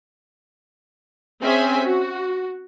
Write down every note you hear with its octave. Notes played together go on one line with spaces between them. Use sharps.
C4 C#4 G#4 C5 E5 G#5
F#4